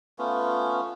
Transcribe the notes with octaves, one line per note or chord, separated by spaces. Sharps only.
A3 B3 C#4 F4